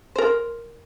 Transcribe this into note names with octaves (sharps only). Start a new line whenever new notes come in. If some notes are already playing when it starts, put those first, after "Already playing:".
A#4 C5